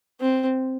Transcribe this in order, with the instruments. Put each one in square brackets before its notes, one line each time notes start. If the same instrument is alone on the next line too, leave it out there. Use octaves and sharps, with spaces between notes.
[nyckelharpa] C4